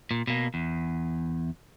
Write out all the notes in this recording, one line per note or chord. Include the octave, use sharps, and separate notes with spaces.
A#2
B2 A#3
E2